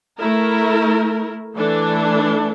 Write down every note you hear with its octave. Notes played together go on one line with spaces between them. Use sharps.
A3 E4 A#4
E3 A3 D4 A4